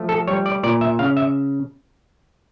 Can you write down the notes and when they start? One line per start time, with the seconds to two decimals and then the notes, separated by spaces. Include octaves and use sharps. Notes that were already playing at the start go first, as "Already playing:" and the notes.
Already playing: F3 A3
0.09 A4
0.28 G3 C#5
0.46 D5
0.63 A#2 D5
0.81 E5
0.99 C#3 F5
1.17 E5